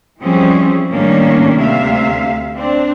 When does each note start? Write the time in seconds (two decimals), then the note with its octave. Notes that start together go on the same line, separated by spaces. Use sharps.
0.22 E3 F3 G3 C4 C#4 G#4
0.93 A2 D#3 G3 A#3 C#4 D4
1.58 D2 C3 E5 F5
2.55 C4 D4